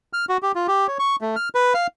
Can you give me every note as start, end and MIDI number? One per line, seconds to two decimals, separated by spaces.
0.13 0.25 89
0.29 0.37 66
0.43 0.52 67
0.55 0.67 65
0.68 0.87 67
0.88 0.98 73
0.99 1.16 85
1.21 1.36 57
1.36 1.49 89
1.55 1.74 71
1.74 1.87 77